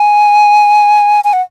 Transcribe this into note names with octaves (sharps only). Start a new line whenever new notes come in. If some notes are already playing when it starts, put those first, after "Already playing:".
Already playing: G#5
G#5
F#5